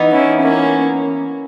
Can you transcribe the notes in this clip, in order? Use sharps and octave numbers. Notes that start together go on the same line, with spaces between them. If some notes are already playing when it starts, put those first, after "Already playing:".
Already playing: E3 B3 D#4
C#4 E4
A#3 C#4